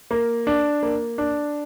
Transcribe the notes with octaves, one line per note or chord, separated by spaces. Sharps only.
A#3
D4
A#3
D4